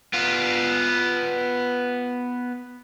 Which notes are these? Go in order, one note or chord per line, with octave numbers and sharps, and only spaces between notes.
B3 F4